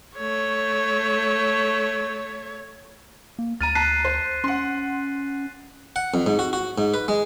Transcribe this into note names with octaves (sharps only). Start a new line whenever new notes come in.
A3 C#5
A#3
D2 A#5 F6 A6 D#7
A5 A#5 F#6 B6 C7
C5
C#4 F#5 C6
F#5
F2
G#2
F#4
F#4
G#2
B4
G#3